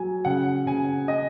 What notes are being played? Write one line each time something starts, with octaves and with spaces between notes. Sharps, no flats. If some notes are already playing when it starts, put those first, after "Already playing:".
Already playing: F#3 G#5
C#3 F#5
C#3 G#5
C#4 D#5